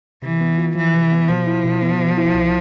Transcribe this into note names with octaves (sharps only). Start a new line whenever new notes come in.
C3 E3
B3
F4
E3 F3
C3
B3
B2 F3
E4
B2
B3
B2
E4
C2